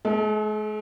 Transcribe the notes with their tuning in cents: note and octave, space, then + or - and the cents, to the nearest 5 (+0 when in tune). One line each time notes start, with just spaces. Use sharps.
G#3 +45 A4 -15